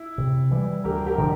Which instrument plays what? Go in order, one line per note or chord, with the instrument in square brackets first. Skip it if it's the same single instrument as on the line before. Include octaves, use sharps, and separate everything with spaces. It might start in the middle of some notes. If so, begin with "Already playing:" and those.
Already playing: [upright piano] E4
[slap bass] C3
E3 G3
[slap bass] D2 [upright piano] G4 A#4
[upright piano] G4 A#4
[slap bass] D3 F3